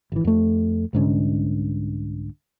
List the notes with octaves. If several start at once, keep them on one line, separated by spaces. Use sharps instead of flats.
G#1 E3
F2 A3
C2 G#2 D3 C#4